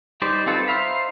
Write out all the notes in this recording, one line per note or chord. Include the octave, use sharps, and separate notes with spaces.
G3 D#4 G4 C5 D5
C4 F4 A4 B4
D#4 C5 E5 F5 B5